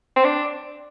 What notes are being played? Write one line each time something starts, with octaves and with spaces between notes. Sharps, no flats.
C4
D4